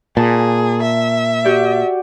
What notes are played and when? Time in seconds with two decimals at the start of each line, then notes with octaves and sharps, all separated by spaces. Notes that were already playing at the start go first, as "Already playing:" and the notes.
0.17 A#2 G#4 A5
0.82 E5
1.45 F#4 G4 D5